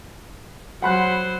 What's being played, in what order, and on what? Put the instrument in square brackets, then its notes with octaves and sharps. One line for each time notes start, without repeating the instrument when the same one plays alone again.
[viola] F#3 C5 [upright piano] F#5 B5 F#6